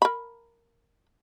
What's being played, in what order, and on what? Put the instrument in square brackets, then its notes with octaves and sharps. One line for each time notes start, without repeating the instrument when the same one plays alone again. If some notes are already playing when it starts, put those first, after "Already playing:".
[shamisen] A#4 B5